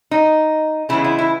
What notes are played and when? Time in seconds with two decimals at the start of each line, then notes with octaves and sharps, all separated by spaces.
0.11 D#4
0.89 C#3 E3 G#3 B3 E4
1.04 E4
1.18 E4